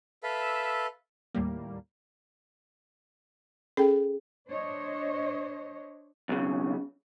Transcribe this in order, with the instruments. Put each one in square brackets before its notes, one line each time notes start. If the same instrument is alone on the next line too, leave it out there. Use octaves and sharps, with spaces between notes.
[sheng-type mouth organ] A4 B4 E5 F5
[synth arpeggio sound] D#2 A2 G3 A#3
[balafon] C#4 A4 G5 [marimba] G#4
[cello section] D4 C5 C#5 D#5
[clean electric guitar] B1 C#3